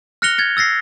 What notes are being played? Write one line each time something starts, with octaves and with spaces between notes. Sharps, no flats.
F6 F#6 A#6 C#7 F7 G7
G#6 A6 C#7
E6 A6 A#6 C7